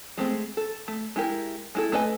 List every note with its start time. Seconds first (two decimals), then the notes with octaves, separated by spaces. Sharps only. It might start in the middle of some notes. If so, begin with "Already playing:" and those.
0.18 G#3 A3 C4
0.57 A4
0.88 A3
1.16 G#3 E4 G4 A#4
1.75 G#3 E4 A4
1.92 A3 A4 B4 D#5 G#5